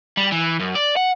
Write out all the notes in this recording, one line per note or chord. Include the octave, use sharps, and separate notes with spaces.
G3
E3
F#2
D5
F#5